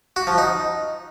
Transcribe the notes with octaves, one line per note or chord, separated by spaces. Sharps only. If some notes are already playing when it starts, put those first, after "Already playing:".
F#4
F3
D#4